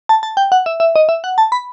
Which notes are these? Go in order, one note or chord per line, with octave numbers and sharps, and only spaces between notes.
A5
A5
G5
F#5
E5
E5
D#5
E5
F#5
A5
B5